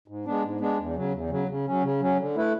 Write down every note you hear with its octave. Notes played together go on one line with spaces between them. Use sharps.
G#2
G#3 B3 D4
G#2
G#3 B3 D4
E2
C#3 F#3
E2
C#3 F#3
C#3
F#3 C#4
C#3
F#3 C#4
D3
A3 E4 B4